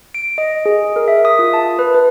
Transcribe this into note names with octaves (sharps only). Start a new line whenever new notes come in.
D7
D#5
G#4
A#4
E5
D#6
F4
A5
B4
B4